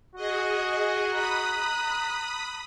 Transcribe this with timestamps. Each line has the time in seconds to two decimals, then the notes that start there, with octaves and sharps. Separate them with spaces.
0.15 F#4 G#4 D#5
1.14 A#5 B5 D#6 F#6